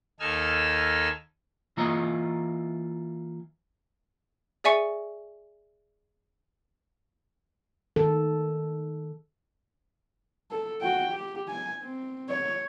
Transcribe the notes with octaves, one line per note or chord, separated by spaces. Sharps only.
D#2 D#4 A4 G#5 E6 F6
E3 A#3 E4 F4 C#5 D#5
G#4 D5 E5 G#5 C#6 C#7
D#3 A4
A4
F#4 G5
G4
G#5
C4
C#5